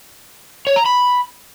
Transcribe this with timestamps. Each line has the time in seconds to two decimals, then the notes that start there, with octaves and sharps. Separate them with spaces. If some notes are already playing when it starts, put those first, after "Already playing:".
0.67 C#5
0.76 A#5
0.86 B5